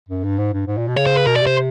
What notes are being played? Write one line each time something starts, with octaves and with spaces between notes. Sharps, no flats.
F#2
G2
G#2
G2
G#2
A#2
B2
C#3 C#5
C5
B4
B2 A#4
D5
C3
C5